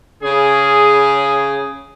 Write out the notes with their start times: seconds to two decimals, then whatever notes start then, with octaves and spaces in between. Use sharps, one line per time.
0.23 C#3 G#4